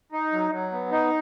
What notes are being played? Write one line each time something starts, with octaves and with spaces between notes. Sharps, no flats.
D#4
F#3
F#3
B3
D#4